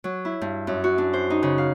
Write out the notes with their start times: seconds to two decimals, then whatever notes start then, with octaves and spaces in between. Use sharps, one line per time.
0.04 F#3
0.25 E4
0.41 G2
0.67 F#2
0.84 F#4
0.98 D4
1.13 C5
1.30 D#4
1.43 C#3
1.58 F5